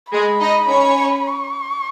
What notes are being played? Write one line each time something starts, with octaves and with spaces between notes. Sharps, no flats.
G#3 G#4 B5
D#4 D#5
C#4 C#5
C#6